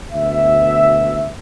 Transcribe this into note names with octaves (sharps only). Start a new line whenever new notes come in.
D2 B2 E5